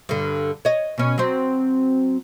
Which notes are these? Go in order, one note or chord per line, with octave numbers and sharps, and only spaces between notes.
G2 D3
C#5 D#5
B2 C#4
F#3 C4